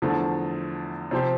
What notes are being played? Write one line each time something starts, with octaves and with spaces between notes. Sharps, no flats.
E2 D3 F3 A3
C3 F3 C4 G4